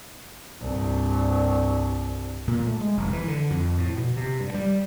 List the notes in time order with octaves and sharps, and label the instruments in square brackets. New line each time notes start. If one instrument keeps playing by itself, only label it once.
[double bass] C2 G2
[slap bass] A#2
A3
G#3
F1
E3
D3
F2
A2
B2
C3
G2
G3